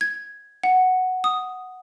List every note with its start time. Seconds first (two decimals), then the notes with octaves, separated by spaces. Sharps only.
0.01 G#6
0.63 F#5
1.24 D#6